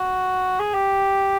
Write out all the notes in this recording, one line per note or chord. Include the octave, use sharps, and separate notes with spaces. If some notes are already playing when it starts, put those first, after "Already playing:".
Already playing: F#4
G#4
G4